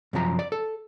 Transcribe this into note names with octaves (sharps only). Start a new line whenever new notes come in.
F#2 C3 F3 A#5
D5
A4